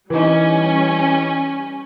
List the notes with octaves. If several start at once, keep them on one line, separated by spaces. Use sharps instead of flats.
E3 G3 C#4 D#4